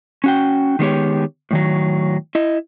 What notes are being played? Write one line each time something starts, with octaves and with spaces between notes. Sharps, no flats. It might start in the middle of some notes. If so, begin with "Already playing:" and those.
C#4 F#4 G5
D#3 G#3 B3 D#4 G4 C#5
A2 D#3 F#3
E4 D#5